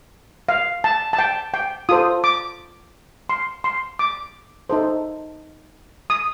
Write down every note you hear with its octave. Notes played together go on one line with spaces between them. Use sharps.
F5
A5
A5
G5
G5
F4 A4 C5 D#6
D6
C6
C6
D6
D#4 A4 C5
D#6